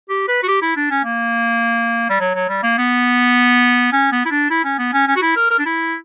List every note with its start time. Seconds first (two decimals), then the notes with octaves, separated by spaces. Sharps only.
0.09 G4
0.28 B4
0.43 F#4
0.48 G4
0.62 E4
0.76 D4
0.91 C#4
1.05 A#3
2.10 G3
2.20 F#3
2.35 F#3
2.49 G3
2.63 A#3
2.78 B3
3.93 C#4
4.12 B3
4.25 E4
4.31 D4
4.50 E4
4.65 C#4
4.79 B3
4.93 C#4
5.08 C#4
5.16 F#4
5.22 E4
5.36 A#4
5.51 A#4
5.59 D4
5.66 E4